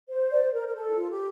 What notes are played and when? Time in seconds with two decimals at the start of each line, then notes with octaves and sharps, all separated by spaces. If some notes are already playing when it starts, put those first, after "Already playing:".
0.10 C5
0.32 D5
0.43 C5
0.53 A#4
0.68 A#4
0.75 A4
0.89 E4
0.96 F4
1.11 G4